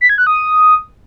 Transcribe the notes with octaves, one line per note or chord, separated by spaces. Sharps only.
B6
G#6
F#6
D#6